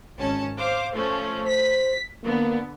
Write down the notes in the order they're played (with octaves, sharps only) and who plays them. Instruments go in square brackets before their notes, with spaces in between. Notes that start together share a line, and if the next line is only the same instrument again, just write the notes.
[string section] G#1 C#4 A5
C5 F5 D6
F3 A3 C#4
[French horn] C5 [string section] B6
[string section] D3 B3 [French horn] A#3